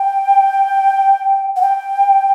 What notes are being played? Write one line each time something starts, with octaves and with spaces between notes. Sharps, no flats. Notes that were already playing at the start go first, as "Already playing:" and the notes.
Already playing: G5
F#5
G5